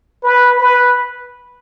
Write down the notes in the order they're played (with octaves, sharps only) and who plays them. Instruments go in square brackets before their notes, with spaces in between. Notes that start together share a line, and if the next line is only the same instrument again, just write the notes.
[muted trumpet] B4
B4